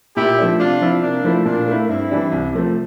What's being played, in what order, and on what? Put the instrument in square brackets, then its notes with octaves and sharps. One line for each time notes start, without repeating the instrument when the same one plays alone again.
[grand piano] A#2 [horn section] E4 G4
[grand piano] F3 A3 D4
[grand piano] C3 [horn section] D4 F4
[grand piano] F3 C4 E4
[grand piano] C3 [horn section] A#3 D4
[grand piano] F3 A3 E4
[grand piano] A#2 [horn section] A#3 D4
[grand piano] A3 E4
[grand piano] G2 [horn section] C4 E4
[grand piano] E3 G3 D4
C2
C3 F3 A3 C4